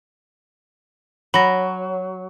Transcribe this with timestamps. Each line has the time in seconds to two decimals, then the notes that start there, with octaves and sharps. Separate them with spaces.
1.34 F#3 B5 A#6